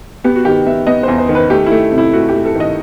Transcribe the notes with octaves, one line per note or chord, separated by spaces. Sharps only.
B3 G4
F#4
D#3 G4
B3 E5
B3 D#5
E2 C5
C5
D#3
B4
A3 G4
A3 E4
C3
E4
A3 F#4
G4
A3
A4
D#3 D#5